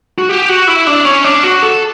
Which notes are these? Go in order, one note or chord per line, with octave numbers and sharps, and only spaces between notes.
F#4
G4
F#4
E4
D4
C#4
D4
F#4
A4